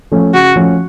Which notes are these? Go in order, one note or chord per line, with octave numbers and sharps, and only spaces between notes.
F3 A3 C#4
C#3 F#4
F3 A3 C#4